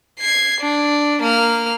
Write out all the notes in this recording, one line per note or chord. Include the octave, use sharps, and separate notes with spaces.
G#6 C7
D4
A#3 F6